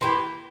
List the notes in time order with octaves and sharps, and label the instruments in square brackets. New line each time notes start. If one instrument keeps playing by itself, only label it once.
[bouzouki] E3 A#3 E4 G4 [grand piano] C6